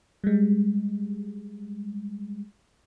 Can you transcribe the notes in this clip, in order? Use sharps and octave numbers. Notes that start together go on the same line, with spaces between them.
G3 G#3